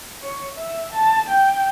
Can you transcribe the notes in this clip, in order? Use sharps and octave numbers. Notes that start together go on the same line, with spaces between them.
C#5
E5
A5
G5